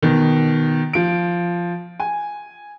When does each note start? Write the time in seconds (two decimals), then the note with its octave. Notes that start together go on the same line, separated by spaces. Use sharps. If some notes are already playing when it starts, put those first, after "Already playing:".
0.02 B2 D#3
0.93 F3 D7
2.00 G#5